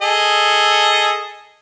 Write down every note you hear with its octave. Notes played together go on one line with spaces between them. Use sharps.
G#4 A4 D#5